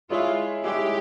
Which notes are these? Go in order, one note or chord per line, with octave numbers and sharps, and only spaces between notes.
G#3 E4 F4 G#4 C#5 E5
G#3 E4 G4 G#4 C#5 E5